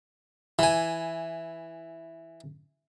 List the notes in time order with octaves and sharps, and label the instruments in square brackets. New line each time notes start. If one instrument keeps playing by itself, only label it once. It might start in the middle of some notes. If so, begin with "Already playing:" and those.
[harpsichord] E3 G#5